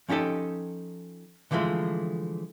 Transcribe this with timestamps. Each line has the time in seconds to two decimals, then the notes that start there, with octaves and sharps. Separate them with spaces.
0.09 F3 C#4 D#4 G4 A4 D#5
1.51 D3 E3 F3 G#3 A3